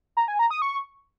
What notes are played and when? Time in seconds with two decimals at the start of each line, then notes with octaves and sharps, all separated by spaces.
0.17 A#5
0.28 G#5
0.39 A#5
0.51 D#6
0.62 C#6